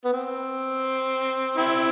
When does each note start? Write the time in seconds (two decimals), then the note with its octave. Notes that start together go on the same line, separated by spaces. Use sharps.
0.05 B3
0.13 C4
1.57 C4 E4